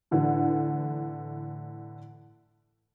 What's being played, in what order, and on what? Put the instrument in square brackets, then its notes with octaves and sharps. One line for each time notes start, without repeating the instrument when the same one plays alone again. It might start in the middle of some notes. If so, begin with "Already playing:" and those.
[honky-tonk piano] A2 D3 E3